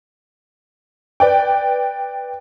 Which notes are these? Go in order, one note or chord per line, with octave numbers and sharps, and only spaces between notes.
B4 D5 G5